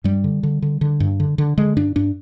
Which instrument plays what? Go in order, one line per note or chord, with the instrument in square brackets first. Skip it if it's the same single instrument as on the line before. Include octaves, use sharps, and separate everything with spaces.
[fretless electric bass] G2 G3
D3
D3
D3
D3
G2
D3
D3
D3 G#3
G2 D4
G2 D4